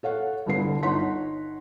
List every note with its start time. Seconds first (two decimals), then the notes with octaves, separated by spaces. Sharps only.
0.03 A4 C#5 F5 F#5
0.46 G1 C2 D3 B3 B4 C7
0.83 G1 D#4 C#5 F#5 C6 B6